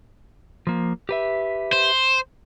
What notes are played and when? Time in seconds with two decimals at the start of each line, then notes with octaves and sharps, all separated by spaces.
0.67 F3 A#3
1.09 G4 B4 E5
1.73 C5